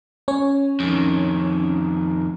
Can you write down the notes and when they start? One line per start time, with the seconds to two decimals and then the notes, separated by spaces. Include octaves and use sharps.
0.28 C#4 C#5
0.80 F2 D#3